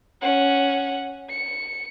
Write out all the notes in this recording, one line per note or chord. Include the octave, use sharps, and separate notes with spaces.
C#4 F#5
C#7